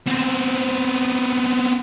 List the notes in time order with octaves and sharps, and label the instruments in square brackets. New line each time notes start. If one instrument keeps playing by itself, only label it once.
[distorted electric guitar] B3 C4